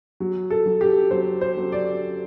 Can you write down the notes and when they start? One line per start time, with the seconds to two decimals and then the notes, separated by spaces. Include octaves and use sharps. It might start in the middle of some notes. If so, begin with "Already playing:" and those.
0.20 F#3
0.50 A4
0.66 F#3
0.81 G4
1.11 F#3 C5
1.41 C5
1.57 F#3
1.72 D5